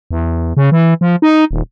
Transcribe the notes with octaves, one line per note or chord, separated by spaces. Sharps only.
E2
C#3
E3
F3
D#4
D#1